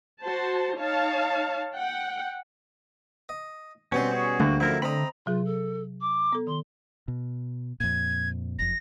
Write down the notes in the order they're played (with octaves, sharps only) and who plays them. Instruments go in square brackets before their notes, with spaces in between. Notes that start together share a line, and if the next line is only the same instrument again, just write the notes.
[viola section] F#4 C5 A5
D#4 C#5 F5 A5
F#5 G5
[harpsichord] D#5
[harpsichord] B2 G3 C6 [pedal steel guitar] C4 C#4
[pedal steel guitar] C#4 F#4 G#4
[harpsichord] D2 [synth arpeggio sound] D3 A3 [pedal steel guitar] G3 A#3 F#4
[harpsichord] F#2 F3 [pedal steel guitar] E4 A#4
[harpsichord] C4 D#5 [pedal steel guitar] A#5 B5
[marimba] C3 F#3 G#4 [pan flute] F4
[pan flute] A4
D6
[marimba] B3 A4
[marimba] D#3 [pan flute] C6
[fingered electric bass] B2
[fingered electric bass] F2 A#2 [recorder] G#6
[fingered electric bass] F#1 F2 [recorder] A#6